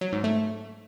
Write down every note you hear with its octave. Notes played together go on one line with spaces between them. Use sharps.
F#3
G#2
A3